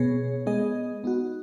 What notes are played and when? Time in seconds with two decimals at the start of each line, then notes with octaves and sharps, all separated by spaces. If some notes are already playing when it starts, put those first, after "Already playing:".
Already playing: B2 B3 G#4 C#5
0.46 G#3 B3 G#4 D#5
1.04 B3 D#4 F#4